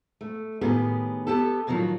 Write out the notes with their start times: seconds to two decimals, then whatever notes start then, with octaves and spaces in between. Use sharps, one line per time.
0.21 A3
0.61 A2 D#3 B3 G4 G#4
1.27 B3 G4 A4
1.67 A2 D3 D#3 F3 F#3